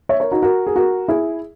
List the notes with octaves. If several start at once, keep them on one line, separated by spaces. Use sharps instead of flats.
C#5 E5
A#4 C#5
D#4 F#4
F#4 A#4
G#4
F#4 A#4
E4 G#4